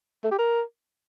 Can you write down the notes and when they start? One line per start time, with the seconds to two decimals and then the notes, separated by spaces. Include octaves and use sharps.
0.24 A3
0.31 G4
0.39 A#4